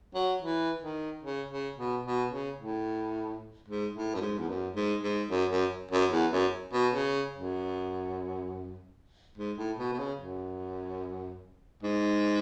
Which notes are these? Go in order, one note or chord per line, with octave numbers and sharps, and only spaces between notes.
F#3
E3
D#3
C#3
C#3
B2
B2
C#3
A2
G#2
A2
F#2
G#2
E2
F#2
G#2
G#2
F#2
F#2
F#2
E2
F#2
B2
C#3
F#2
G#2
A2
B2
B2
C#3
F#2
G#2